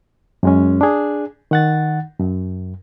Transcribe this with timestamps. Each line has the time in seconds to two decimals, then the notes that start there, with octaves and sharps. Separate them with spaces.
0.43 F#2 G#3 C#4
0.81 D4 G#4
1.51 D#3 F#5 A6
2.20 F#2